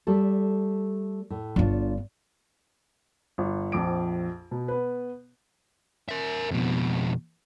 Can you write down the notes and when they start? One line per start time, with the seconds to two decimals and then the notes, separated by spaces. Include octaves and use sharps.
0.07 G3 A3 A4
1.30 A2
1.56 G1 B3 D4 F4 C#5
3.38 G1
3.72 A#1 F2 D6 D7
4.51 B2
4.68 B3 B4
6.09 A#4 E5
6.51 F2 B2